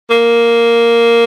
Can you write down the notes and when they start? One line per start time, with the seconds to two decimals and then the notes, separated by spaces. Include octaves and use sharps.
0.09 A#3